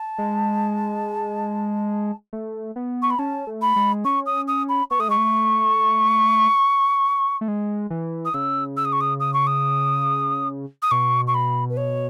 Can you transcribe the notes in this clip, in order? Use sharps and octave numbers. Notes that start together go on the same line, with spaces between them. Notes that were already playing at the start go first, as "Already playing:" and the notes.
Already playing: A5
G#3
A3
B3
C#6
B5
C#4 A5
A3
B5
G#3
C#4 C#6
D#6
D#6
B5
B3 C#6
A3 D#6
G#3 C#6
A3
A3
G#3
E3
D#6
C#3 E6
E6
D#6
C#6
D#6
D#6
C#6
D#6
D#6
B2 C#6
C#6
B5
B4
C#5